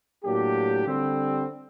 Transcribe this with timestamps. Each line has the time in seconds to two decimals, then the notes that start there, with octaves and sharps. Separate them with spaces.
0.24 A2 F#3 A#3 D4 G4
0.85 D3 G3 C4